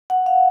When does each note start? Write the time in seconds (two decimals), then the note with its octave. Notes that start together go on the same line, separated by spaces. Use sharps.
0.10 F#5
0.26 F5